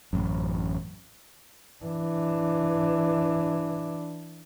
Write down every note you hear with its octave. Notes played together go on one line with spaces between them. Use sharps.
A1 F#2
E3 D4